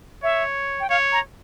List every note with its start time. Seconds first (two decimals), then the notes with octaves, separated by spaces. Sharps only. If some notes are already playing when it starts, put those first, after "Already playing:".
0.23 C#5 E5
0.80 G5
0.90 C#5 F5
1.12 A#5